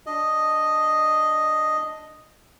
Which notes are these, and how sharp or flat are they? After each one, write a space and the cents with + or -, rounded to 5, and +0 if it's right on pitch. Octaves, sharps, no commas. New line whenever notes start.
D4 +0 D#5 +0